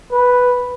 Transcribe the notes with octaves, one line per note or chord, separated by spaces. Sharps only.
B4